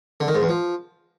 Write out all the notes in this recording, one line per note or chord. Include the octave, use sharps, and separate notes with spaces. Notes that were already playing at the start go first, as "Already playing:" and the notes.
D3
D#3
G#2
E2
F3